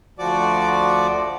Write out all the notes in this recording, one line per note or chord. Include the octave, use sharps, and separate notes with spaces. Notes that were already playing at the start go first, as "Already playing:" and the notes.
D2 F3 F#4 D5 D6